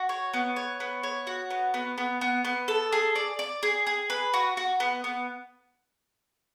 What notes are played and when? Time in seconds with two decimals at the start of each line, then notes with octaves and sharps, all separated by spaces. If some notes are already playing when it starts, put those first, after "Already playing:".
Already playing: F#4
0.09 C#5
0.34 B3
0.56 C#5
0.80 B3
1.03 C#5
1.27 F#4
1.50 B3
1.74 B3
1.98 B3
2.21 B3
2.45 B3
2.68 A4
2.92 G#4
3.16 D5
3.39 D5
3.63 G#4
3.87 G#4
4.10 B4
4.34 F#4
4.57 F#4
4.80 B3
5.04 B3